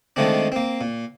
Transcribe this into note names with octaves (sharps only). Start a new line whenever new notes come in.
D#3 F3 G#3 A3 C4 D4
A#3 C4
A#2